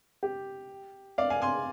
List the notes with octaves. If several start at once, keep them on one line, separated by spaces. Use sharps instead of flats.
G4
D5 F5
F5 G#5
G#5 C6